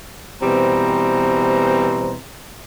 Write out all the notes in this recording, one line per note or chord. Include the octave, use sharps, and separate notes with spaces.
B2 E3 G3 C4 C5 A#5